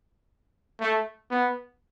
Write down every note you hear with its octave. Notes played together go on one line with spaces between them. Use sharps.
A3
B3